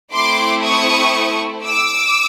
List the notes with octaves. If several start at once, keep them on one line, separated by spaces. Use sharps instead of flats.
A3 C4 E4 C6 D6
C#6 D#6
D6 E6